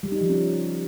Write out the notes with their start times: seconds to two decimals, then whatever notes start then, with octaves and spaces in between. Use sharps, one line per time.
0.03 G3
0.12 D#4
0.21 F3
0.30 C#4